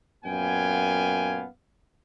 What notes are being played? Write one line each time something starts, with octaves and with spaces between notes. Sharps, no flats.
F#2 A#2 B3 F5 G5 G#5